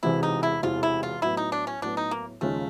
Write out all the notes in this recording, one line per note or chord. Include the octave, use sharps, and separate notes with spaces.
E1 E2 C3 E3 E4
D#4
E4
E1 E2 C3 E3 F4
E4
F4
A2 F#3 B3 E4
D#4
D4
C#4
A2 F#3 B3 D4
D#4
A#3
D#2 C#3 F3 G#3 A3 C#4